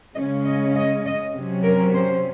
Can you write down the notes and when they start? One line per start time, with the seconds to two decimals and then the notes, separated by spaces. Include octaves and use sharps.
0.15 C#3 G#3 C#4 D#5
0.45 D#5
0.75 D#5
1.05 D#5
1.35 C3 F#3 C#4
1.64 A#4
1.94 C5